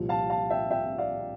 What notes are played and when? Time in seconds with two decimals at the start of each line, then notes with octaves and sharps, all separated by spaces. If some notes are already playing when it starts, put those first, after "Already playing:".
Already playing: C2 A#2 F3
0.09 F5 A5
0.30 F5 A5
0.50 E5 G5
0.71 E5 G5
0.98 D5 F5